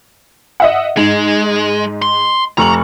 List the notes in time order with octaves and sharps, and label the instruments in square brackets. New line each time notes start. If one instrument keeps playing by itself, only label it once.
[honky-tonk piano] D#5 E5 F#5
[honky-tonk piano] G#2 [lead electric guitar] G#3
[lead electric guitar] C6
[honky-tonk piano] F1 C#6 F#7 [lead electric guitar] A#5